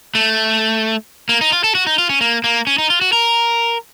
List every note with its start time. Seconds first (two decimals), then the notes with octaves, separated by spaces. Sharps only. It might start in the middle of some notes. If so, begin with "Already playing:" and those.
0.15 A3
1.29 A#3
1.41 D#4
1.52 F4
1.64 A4
1.75 F#4
1.87 D#4
1.98 F4
2.09 C#4
2.21 A#3
2.44 A#3
2.67 C#4
2.78 D#4
2.90 F4
3.01 F#4
3.13 A#4